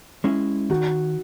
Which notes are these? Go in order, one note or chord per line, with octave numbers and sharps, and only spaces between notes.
G#3 C#4 E4
D#3 F#4